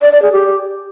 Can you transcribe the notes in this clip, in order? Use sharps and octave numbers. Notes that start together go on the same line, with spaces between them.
D5
D5
G#4
G4